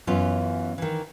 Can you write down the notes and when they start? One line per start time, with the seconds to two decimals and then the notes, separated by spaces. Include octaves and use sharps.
0.07 F#2 E3 B3 C#4 F4
0.78 D#3 E3